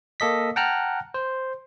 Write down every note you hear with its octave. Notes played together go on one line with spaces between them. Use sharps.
A#3 A4 D#5 B6
F#5 G5 A5 A#5 F6 F#6
C5